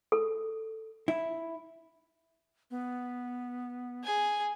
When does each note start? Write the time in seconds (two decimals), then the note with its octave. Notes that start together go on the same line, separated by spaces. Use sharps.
0.12 A4
1.08 E4
2.71 B3
4.03 G#4 G#5